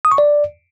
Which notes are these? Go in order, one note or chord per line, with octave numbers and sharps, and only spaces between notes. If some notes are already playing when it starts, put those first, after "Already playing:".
D#6
C#6
D5